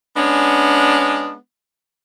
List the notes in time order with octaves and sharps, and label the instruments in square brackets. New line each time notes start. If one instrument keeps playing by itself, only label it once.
[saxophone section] G#3 B3 C#4 D4